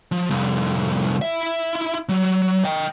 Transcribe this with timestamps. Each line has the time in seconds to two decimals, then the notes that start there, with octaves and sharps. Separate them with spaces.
0.12 F3
0.30 C2 F2
1.22 E4 E5
2.09 F#3
2.64 D#5 G5